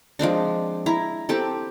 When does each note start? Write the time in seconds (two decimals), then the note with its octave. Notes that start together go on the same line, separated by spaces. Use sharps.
0.19 F3 G#3 C4 D4
0.86 E4 A#5
1.29 C4 G4 A4